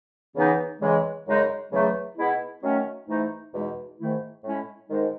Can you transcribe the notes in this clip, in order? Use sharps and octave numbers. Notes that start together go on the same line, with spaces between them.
E2 C#3 E3 B3 D#4
E2 C#3 E3 G#3
F#2 C#3 G#3 D#4
E2 C#3 F#3 A3
B2 G#3 B3 E4
D#3 F#3 A3 C#4
G#2 E3 A3 D#4
E2 B2 G#3 D#4
G#2 D#3 A3 E4
A2 G#3 C#4 E4
G#2 D#3 G#3 D#4